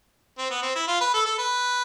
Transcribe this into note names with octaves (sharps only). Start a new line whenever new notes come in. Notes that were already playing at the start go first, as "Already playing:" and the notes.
C4
B3
C4
E4
F4
B4
A4
A4
B4